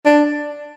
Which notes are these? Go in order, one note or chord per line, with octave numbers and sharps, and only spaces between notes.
D4